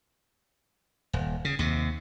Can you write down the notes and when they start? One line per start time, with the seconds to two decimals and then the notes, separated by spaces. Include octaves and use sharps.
1.13 D#1
1.45 C#3
1.59 D#2 C3